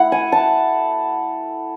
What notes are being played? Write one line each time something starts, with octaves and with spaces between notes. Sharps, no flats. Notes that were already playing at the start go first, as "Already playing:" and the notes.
Already playing: A3 E4 F#5
G#5
A5